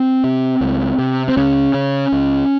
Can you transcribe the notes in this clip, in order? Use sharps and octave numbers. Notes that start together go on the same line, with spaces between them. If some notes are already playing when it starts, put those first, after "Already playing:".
Already playing: C4
C3
C#2
C3
C4
C#2 C#3 C#4
C#3
C#2